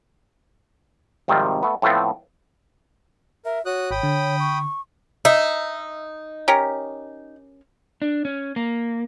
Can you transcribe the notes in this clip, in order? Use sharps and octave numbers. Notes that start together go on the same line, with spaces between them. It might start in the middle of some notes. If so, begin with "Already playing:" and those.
G#1 C3 D#3 F3 G3 C4
A3 B3
A2 F3 A3 B3 C4
A#4 E5
F#4 C#5 D#6 F#6
G#1 G5 B5 D#6
D3
C#6
D#4 E5
C#4 G4 A#4
D4
C#4
A#3